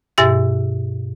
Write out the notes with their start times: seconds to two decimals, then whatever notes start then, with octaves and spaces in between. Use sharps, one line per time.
0.18 G2 B2 G4 E5 A6